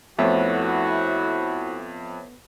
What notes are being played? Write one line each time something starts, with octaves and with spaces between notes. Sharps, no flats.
F2 A3 B3 E4 F#4 C5 C#5 E5